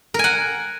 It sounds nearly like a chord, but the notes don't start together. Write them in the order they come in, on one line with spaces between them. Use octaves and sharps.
A#4 G#5 F#5